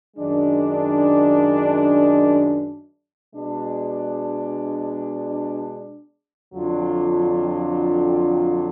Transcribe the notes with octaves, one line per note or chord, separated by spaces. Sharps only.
F#2 D#3 G#3 D4
B2 G#3 D4
F2 D3 F#3 D4 F4